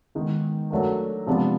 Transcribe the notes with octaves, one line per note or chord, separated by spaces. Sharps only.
D#3 G#3 B3 D#4
F#3 A3 D4 F#4 A#4
C3 F3 G#3 B3 D4